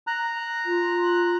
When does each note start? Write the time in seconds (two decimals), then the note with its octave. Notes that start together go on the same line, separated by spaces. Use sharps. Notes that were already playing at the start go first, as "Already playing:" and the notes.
0.07 A#5 F#6
0.66 F4